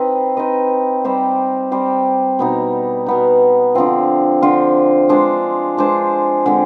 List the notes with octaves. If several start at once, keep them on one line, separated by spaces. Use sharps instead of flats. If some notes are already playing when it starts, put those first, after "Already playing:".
Already playing: C4 D#4 B4 D#5
C4 D#4 B4 D#5
G3 C4 G4 C5
G3 C4 G4 C5
B2 B3 D#4
B2 B3 D#4
D3 F3 C4 F4
D3 F3 C4 F4
G#3 D4 G#4 C5
G#3 D4 G#4 C5
D3 G#3 C4